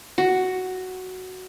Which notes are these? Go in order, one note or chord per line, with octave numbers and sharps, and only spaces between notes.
F#4